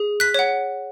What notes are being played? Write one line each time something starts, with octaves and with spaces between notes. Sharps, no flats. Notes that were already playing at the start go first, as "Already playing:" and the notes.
Already playing: G#4
F#6 B6
C#5 F#5